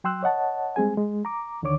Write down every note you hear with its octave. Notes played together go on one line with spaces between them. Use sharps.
F#3 G5 C6 E6 F#6
C#5 D#5 F#5 A5
G3 G#3 C4 G#4 G#5
G#3
A#5 D6
D2 D3 D#3 D4 C#5 D6